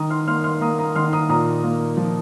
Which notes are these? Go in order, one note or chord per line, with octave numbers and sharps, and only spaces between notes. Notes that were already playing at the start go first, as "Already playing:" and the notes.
Already playing: D#3 A#5 D#6
C6 F6
A#3 C6 F6
C6 F6
A#3 A#5 D#6
A#5 D#6
D#3 C6 F6
A#5 D#6
A#2 A#5 D#6
A#3
F3